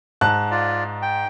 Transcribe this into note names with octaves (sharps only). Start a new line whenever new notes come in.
G#2 A5 F#6
F4 D5
G5